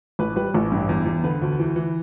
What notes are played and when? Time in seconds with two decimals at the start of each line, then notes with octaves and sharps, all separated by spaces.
0.19 A1 B4
0.36 G3 B4
0.54 A1
0.72 G2
0.89 E2
1.06 E2
1.24 D3 B4
1.42 D2
1.59 E3
1.76 E3